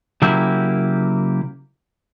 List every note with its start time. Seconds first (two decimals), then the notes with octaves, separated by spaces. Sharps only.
0.22 C#3 F#3 A#3 E4 G4